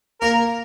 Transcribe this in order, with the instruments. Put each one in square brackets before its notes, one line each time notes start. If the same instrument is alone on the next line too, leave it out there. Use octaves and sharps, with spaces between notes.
[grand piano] A#3 [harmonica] A#4